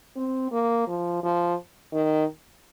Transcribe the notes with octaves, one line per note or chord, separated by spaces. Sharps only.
C4
A#3
F3
F3
D#3